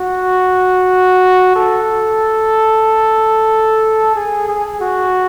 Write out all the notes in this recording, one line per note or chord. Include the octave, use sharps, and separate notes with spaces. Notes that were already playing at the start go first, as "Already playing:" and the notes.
Already playing: F#4
A4
G#4
G#4
F#4